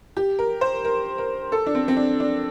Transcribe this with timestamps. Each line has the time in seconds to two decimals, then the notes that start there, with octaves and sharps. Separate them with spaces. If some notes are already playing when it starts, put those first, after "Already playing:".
0.17 G4
0.39 A#4
0.61 C5
0.85 A#4
1.18 A#4
1.52 A4
1.67 D4
1.75 C4
1.88 C4
1.97 D4
2.20 D4